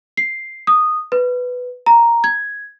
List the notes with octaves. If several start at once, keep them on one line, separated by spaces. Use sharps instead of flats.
C7
D#6
B4
A#5
G#6